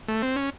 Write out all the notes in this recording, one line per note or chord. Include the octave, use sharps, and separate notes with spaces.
A3
C4
C#4